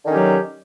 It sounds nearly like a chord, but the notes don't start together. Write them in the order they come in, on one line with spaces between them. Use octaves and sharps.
D3 D#3 C#4 G4 F#3